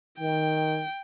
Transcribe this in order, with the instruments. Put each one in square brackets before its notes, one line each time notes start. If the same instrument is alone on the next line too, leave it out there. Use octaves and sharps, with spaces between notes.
[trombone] D#3 [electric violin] G5